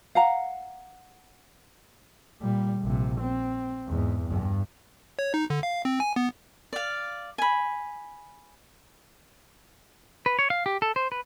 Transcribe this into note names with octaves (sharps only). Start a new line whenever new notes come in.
F5 F#5 A#5
A#2 G3
A#1 C3
C4
E2 G#2
G2
C#5
D#4
D3
F5
C4
G#5
B3
D5 F5
G#5 B5
B4
C#5
F5
G4
A4
C5
B4